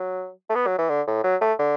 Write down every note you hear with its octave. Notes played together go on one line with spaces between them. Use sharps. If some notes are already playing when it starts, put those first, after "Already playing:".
Already playing: F#3
A3
B3
F#3
E3
D3
A2
F#3
A3
D3